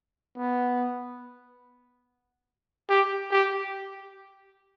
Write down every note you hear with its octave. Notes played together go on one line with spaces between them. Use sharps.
B3
G4
G4